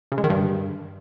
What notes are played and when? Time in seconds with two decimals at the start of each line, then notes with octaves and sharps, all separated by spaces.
0.12 C#3
0.18 G#3
0.24 D#3
0.30 G2